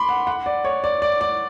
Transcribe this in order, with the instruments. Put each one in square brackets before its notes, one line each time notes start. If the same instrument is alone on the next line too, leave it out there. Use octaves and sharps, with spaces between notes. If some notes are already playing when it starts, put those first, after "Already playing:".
Already playing: [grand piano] B5 C6 D6
F#5
F#5
D5
C#5
D5
D5
D5